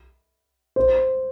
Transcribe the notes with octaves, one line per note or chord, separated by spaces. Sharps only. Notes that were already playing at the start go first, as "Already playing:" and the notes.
C5